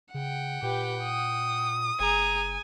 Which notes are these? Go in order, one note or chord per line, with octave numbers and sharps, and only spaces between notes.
C#3 F#5 G5
A#2 G4 B4
D#6
F#1 G#4 G#5 A#5